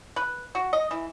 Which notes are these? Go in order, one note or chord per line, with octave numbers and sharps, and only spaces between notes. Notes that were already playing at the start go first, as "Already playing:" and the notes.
B4
F#4
D#5
E3